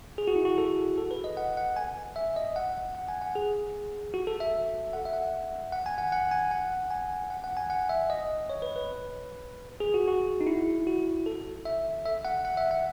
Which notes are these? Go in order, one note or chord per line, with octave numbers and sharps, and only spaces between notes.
G#4
F#4
E4
F#4
A4
A4
B4
D#5
F#5
F#5
G#5
E5
D#5
F#5
F#5
G#5
F#5
G#4
F#4
A4
E5
F#5
E5
F#5
F#5
G#5
F#5
F#5
G#5
F#5
G#5
F#5
F#5
G#5
F#5
E5
D#5
C#5
B4
B4
G#4
F#4
F#4
D#4
E4
F#4
A4
E5
E5
F#5
F#5
E5
F#5